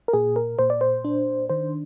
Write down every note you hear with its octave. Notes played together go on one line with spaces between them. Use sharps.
A#4
A#2 G#4
A#4
A#2 C5
D5
C5
D4
D#3 C5